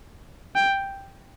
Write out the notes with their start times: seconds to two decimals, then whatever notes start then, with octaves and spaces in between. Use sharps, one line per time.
0.56 G5